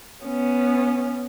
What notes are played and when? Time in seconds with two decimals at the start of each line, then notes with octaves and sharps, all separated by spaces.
0.24 B3 C#4